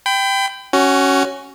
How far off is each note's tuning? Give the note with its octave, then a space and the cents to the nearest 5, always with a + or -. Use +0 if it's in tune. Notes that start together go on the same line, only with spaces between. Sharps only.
G5 +0 B5 +35
C#4 +0 F#4 +20